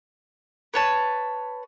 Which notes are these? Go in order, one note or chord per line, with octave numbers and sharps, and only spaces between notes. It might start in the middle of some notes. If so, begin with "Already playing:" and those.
B4 C#5 A5